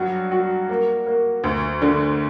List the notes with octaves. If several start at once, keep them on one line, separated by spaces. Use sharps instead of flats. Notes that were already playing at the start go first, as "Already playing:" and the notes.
Already playing: G2 F#3 F#4
F#4
A#3
A#3
D2
D3